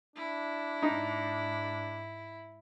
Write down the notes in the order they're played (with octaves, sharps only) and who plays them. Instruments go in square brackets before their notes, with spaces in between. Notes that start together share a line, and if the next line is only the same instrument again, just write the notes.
[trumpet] D4 [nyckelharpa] E4
[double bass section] G#2 [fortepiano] D#4